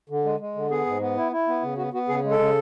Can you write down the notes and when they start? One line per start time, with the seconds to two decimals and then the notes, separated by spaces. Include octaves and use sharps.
0.09 D3
0.25 G#3
0.40 G#3
0.55 D3
0.71 B3 G#4
0.86 G#2
1.01 B3
1.17 E4
1.32 E4
1.48 B3
1.63 C#3
1.78 B3 F#4
1.93 B3 F#4
2.08 C#3 G#4
2.24 G#3
2.31 A4
2.39 C#3